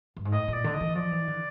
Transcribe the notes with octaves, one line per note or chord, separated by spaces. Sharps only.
G2
G#2
A2 D#5
A#2
D5
D3
D#5
E3
F3 D5
E3
D3